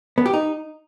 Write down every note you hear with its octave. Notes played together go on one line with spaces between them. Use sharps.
B3
G4
D#4